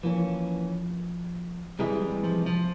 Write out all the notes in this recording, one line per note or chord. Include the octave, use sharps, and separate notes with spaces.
E3 F3 A#3 C#4
C3 E3 G3 G#3 E4 G#4
G3
F3
F3